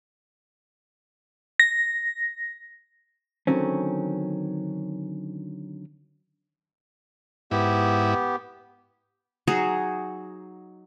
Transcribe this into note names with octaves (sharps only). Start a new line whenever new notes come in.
A#6
D3 D#3 F#3 C4 C#4
G#2 B3 E4 G4
F#3 D#4 F#4 G#4